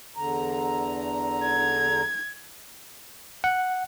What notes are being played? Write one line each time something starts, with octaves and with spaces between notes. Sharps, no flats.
E2 D3 A#5
G#6
F#5